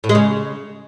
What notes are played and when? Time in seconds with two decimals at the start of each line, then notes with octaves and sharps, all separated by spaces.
0.04 A2
0.09 G#3
0.15 C#3